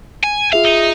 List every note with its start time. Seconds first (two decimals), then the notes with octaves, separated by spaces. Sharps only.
0.23 G#5
0.53 F4 G#4 E5 F5
0.64 D#4